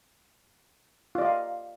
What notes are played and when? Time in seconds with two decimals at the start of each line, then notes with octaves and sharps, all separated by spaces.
1.15 F4
1.18 D5
1.22 D#5
1.25 F5